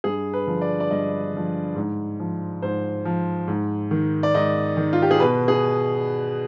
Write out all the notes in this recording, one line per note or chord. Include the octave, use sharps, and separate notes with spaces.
G2 G#4
B4
D3 F3
D5
D5
G2 D#5
D3 F3
G#2
F3
G#2 C5
F3
G#2
D#3
D5
G#2 D#5
D#3
F4
G4
G#4
B2 B4
G#4